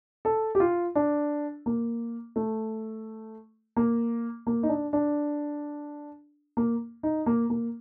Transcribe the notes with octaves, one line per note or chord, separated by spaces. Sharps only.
A4
G4
F4
D4
A#3
A3
A#3
A#3
D#4
D4
D4
A#3
D#4
A#3
A#3